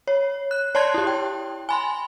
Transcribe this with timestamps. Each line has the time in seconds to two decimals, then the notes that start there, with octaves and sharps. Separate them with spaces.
0.07 C#5
0.51 F#6
0.75 C#5 D5 A5 C6 F#6 G#6
0.94 E4 G4
1.07 G5
1.69 G#5 B5 C6